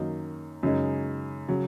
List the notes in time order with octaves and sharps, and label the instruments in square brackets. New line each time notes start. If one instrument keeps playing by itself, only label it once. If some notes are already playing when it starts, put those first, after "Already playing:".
Already playing: [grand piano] F#2 D#3 F#3 A#3 D#4
F#2 C#3 G#3 D#4
C#3 F#3